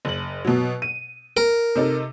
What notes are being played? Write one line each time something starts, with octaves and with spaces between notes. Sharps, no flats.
F#1 F#7
B2 F#3
D#7
A#4
C3 D#4 A4